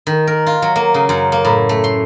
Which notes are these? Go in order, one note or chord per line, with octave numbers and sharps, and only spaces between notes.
D#3
A#4
F4
F#3
A#3
C#3
F#2
A#3
A2
A3
C6